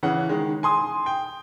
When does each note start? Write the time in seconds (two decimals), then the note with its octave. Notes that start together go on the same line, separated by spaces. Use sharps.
0.03 C#3 E3 F#5
0.29 D#3 G#3
0.63 G#5 C6 D#6
1.06 G5